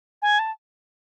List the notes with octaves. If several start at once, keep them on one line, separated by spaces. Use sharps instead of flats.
G#5
A5